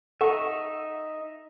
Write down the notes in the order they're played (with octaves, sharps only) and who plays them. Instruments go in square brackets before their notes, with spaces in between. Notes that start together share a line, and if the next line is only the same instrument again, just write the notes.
[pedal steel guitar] D#4 E5 [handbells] A4 F#5 C#6